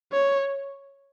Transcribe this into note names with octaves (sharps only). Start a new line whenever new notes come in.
C#5